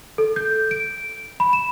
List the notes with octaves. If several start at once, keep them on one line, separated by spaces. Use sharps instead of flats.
A4
G6
D7
B5
E7